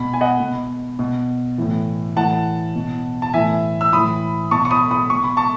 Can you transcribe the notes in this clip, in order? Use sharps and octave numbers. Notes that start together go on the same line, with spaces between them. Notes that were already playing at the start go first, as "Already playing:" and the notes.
Already playing: B2 B5
G#5
D#5 F#5
B2
B2
A2 E3
A2 E3 F#5 A5
B2
A5
A2 E3 E5 G#5
E6
A2 E3 B5 D#6
B2 A5 C#6
C#6
B5 D#6
B5 D#6
B2 C#6
B5
A5 C#6